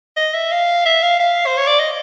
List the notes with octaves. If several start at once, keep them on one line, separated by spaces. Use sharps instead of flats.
D#5
E5
F5
E5
F5
F5
C5
C#5
D5
D#5